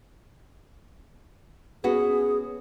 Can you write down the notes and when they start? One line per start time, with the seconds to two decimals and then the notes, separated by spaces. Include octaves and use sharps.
1.84 B3 C#4 F#4 G#4